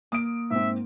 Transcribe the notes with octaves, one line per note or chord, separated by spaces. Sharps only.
A#3 D#6 D7
G#2 C4 E5